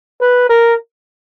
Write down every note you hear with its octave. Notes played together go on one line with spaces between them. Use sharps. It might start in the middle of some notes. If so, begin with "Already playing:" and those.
B4
A#4